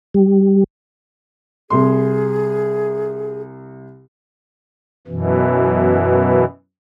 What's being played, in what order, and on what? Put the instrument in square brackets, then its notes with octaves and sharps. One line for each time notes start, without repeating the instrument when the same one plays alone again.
[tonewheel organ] G3
[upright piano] C2 C6 [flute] G#4
[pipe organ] F#2 B2 E3